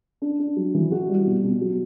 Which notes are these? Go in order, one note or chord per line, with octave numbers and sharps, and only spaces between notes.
D4
D4
F#3
E3
F#4
G3
B2
B2
F#3